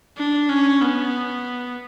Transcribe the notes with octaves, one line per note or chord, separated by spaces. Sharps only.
D4
C#4
B3